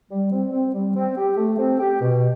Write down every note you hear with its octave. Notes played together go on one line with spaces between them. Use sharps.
G3
C4
C4
G3
C4
G4
A3
C4
G4
B2